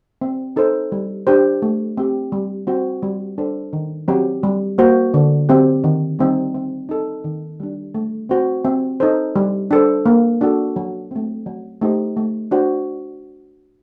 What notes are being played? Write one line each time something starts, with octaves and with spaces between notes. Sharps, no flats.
C4
D#4 A4 C5
G3
D4 G4 C5
A3
C4 G4
G3
C4 F#4 C5
G3
D4 A4 C5
D#3
F#3 C4 G4
G3
A#3 F#4 C5
D3
F#3 C4 G4
D#3
G3 C4 D#4
C4
D#4 A4
D#3
G3 D4
A3
C4 F#4 C5
C4
D#4 A4 C5
G3
D4 A4 C5
A#3
D4 F#4 A4
F#3
A3 C4
F#3
A3 D#4 G4 C5
A3
D4 F#4 C5